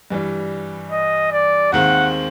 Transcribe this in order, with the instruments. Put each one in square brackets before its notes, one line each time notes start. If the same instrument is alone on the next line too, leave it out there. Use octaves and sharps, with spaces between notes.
[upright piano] G2 E3 G3
[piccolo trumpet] D#5
D5
[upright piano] D#2 D#3 G#3 C4 [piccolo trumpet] F#5